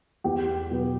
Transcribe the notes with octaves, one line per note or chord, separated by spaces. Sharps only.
E2 G4
B2 F#3 B3